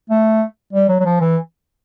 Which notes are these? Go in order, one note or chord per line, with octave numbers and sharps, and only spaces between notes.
A3
G3
F#3
F#3
F3
E3